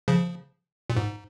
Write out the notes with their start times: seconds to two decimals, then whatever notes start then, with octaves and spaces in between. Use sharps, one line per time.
0.08 C#3 F3
0.90 A#2
0.96 G#2